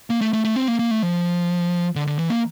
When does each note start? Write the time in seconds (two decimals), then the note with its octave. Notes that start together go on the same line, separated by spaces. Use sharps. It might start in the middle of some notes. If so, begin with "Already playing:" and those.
0.10 A#3
0.21 A3
0.33 A3
0.45 A3
0.56 C4
0.68 A#3
0.79 A#3
0.91 A3
1.03 F3
1.95 D3
2.07 D3
2.19 E3
2.30 A#3